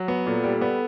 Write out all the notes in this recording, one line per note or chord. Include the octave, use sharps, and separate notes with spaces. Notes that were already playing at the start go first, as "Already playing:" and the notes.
Already playing: F#3
B3
A#2 A4
G3
B3